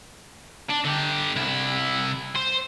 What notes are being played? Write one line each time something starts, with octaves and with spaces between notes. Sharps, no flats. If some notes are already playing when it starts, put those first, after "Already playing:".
D4
D3 G4
C2 E4
C5